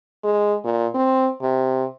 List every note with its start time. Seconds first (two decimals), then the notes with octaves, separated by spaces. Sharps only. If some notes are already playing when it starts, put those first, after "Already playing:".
0.24 G#3
0.65 A#2
0.94 C4
1.42 C3